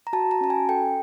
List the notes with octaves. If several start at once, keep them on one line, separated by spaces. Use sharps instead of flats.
A#5
F#4 A5
A#5
C#4 A5
G#5
A4 G5